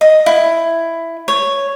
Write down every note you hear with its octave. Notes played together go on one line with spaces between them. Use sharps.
D#5
E4
C#5